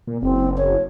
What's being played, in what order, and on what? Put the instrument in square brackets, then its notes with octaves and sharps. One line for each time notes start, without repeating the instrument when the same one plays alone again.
[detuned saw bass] A#2
[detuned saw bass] F#1 [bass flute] C4
[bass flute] C#5